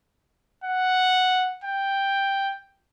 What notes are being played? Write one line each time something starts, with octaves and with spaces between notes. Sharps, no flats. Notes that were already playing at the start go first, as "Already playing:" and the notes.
F#5
G5